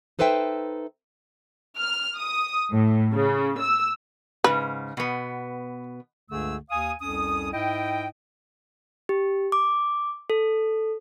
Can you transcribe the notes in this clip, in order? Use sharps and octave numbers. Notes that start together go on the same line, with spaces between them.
D#4 A4 B4 C5 E5 G5
F6
D#6
A2
C#3
E6
G#2 C#3 B4
B2 B3
C#2 G2 D3 A3 G#4 E6
D#2 F5 G#5 D#6
C2 F2 C#4 D#6
G#2 E4 D#5 G5
G4
D6
A4